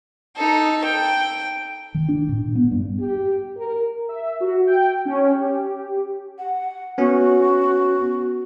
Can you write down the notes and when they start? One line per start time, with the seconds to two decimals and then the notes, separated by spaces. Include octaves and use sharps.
0.36 D#4 A4
0.84 G5
1.95 D#3
2.09 D4
2.29 A2
2.43 A#2
2.55 B3
2.71 G2
3.00 G4
3.58 A#4
4.09 E5
4.40 F#4
4.67 G5
5.05 C#4
5.35 G4
6.39 F#5
6.98 B3 C#4 F#4